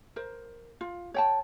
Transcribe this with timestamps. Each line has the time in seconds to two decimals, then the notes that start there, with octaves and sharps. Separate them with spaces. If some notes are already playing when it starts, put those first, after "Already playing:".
0.16 A#4 C5
0.81 F4
1.14 C#5 G5 A5